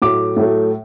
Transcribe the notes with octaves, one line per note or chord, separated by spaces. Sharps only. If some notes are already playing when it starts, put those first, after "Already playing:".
A2 F#3 A3 D6
A2 F#3 A3